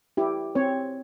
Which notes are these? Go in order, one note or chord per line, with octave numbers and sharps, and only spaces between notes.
E4 G4
C4 C#5